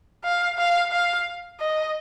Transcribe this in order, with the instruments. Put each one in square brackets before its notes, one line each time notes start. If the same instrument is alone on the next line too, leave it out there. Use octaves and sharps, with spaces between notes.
[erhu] F5
F5
F5
D#5